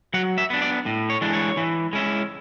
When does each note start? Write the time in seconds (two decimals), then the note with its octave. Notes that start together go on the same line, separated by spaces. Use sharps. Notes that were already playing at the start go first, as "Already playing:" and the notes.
0.14 F#3 F#5
0.38 E5
0.50 B3 D4
0.62 D5
0.86 A2
1.10 C#5
1.21 E3 G#3 D4
1.33 C#5
1.57 E3
1.93 G#3 C#4 E4